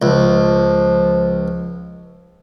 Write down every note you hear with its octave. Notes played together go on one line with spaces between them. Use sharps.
C#2 F3